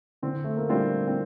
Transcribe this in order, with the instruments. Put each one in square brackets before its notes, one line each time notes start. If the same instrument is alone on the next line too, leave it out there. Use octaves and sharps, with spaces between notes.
[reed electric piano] D3 [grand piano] C4
[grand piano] A3
A#3
[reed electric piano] G3 D4 F4 [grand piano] C4
[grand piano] C4